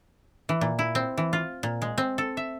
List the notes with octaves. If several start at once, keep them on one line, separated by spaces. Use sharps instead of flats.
E3
A#2
E4
C4
E3
F4
A#2
G#3
C4
A4
E5